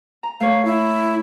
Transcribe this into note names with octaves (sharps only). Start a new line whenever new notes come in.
A#5
A3 C#5 F5
E4